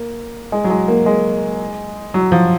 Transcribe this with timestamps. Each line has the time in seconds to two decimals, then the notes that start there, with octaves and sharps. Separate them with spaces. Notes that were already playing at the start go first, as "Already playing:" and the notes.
Already playing: A#3
0.52 G#3
0.64 F#3
0.70 G#3
0.88 A#3
1.06 G#3
2.14 F#3
2.32 F3